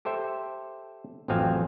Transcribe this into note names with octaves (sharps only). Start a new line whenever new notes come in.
G4 A4 C5 E5
A1 F2 F#3 C4 F5 G#5